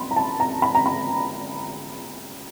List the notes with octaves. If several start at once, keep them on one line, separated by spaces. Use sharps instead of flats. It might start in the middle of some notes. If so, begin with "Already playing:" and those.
Already playing: B5 C6
A#5
A5
A#5
B5
A#5
B5